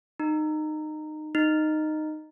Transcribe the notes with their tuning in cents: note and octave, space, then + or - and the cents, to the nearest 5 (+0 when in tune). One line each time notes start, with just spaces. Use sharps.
D#4 -20
D#4 -10